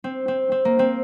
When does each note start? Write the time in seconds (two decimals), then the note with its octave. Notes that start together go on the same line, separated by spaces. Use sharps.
0.04 C4
0.28 C4
0.52 C4
0.65 A#3
0.79 C4